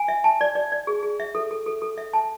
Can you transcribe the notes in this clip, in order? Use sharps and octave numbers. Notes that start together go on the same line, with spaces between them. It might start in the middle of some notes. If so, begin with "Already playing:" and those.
Already playing: G#5
E5
A5
D5
D5
D5
G#4
G#4
E5
A4
A4
A4
A4
E5
A5